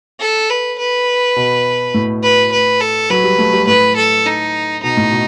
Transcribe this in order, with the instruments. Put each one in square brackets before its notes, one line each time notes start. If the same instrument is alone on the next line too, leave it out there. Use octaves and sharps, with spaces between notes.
[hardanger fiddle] A4
B4
B4
[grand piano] B2
A2
[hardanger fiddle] B4
B4
A4
[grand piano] F#3 [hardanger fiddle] B4
[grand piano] G3
A3
G3
[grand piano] A2 [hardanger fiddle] B4
[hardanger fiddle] A4
D#4
[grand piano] B2 [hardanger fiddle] D#4
[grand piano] A2
B2